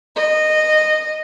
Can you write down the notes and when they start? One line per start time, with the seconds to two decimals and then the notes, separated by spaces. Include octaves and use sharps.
0.16 D#5